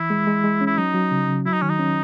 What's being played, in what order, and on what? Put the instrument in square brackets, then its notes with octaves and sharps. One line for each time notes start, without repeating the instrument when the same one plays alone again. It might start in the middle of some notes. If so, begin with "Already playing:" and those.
Already playing: [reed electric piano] E3 [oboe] E4
[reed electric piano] G#3
G#3
G#3
C#4
[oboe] E4
[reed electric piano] F#3 [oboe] D#4
[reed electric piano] F#3
C#3
C#3
[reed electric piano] F#3 [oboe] E4
[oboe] D#4
[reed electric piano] D#3 [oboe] C#4
[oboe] D#4
[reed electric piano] C#4